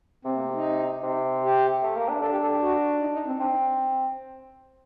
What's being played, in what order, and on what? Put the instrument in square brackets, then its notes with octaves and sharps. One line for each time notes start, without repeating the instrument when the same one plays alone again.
[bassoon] C3 [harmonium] C4
[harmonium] A#3
A3
D#4
[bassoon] C3
[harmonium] G4
[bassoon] A3
A#3
D4
[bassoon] D4 [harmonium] A4
[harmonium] G4
A4
G4
F#4
D#4
D#4
C4
[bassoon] C4 [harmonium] D4